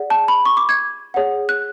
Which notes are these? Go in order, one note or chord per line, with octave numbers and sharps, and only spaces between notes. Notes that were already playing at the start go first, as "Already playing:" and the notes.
Already playing: G#4 D5 F#5
A5
B5
C#6
D6
G#6
G#4 C#5 F#5
F#6